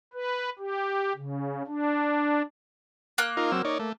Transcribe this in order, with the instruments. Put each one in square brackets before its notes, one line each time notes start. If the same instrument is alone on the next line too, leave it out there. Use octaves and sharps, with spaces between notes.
[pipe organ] B4
G4
C#3
D4
[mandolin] A#3 F#6
[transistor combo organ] D#4 F4 A#4
F#3 C4 E6
D#4 C#5 D5
A3